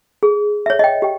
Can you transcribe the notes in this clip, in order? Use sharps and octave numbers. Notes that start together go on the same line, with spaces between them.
G#4
C#5 E5
D#5 G5
G4 G5